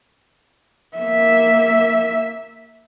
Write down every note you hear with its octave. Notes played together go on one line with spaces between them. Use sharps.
A#3 E5